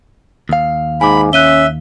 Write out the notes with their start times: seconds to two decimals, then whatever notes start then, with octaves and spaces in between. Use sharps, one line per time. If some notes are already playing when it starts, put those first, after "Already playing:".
0.49 D#2 F5
1.01 G#2 G#5 B5 D6
1.33 C#4 E5 F#6 D#7 G7